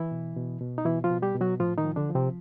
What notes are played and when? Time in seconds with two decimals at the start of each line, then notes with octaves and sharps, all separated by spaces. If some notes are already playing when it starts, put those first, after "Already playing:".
Already playing: E3 E4
0.11 B2
0.36 B2
0.61 B2
0.78 D#4
0.85 B2 E3 E4
1.04 F3 F4
1.10 B2
1.22 G3 G4
1.35 B2
1.41 F#3 F#4
1.60 A2 F3 F4
1.78 D#3 D#4
1.85 F3
1.96 D3 D4
2.09 F3
2.15 C3 C4